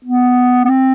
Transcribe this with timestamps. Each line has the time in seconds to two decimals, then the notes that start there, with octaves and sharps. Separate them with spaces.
0.05 B3
0.65 B3
0.69 C4